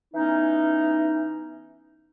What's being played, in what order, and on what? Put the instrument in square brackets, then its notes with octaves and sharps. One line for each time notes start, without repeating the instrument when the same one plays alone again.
[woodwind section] E3 B3 C#4 D#4